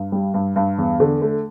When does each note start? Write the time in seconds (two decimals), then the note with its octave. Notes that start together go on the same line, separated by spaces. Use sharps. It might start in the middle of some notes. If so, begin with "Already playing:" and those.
Already playing: G2
0.12 G3
0.34 G2
0.56 G2
0.78 E2
1.00 D3
1.22 A3